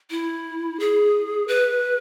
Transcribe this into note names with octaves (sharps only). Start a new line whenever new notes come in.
E4
G#4
B4